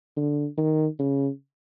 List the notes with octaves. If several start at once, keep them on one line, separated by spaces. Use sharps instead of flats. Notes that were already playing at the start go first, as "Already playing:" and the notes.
D3
D#3
C#3